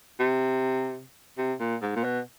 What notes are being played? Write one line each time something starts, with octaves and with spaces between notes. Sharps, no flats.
C3
C3
A#2
G#2
A#2
B2